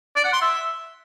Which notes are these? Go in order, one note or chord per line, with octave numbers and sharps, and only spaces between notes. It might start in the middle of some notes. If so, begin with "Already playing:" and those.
D5
F#5
C6
E5